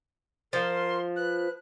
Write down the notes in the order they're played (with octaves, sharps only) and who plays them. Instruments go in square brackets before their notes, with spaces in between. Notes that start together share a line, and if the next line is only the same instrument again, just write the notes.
[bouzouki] F3 [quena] A#4 [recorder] C6
[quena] B4 [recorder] F#6